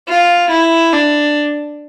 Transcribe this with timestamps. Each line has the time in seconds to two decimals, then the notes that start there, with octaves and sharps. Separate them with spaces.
0.08 F4
0.50 E4
0.93 D4